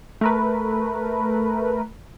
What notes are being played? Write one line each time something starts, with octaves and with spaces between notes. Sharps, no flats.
A3 A#4 B4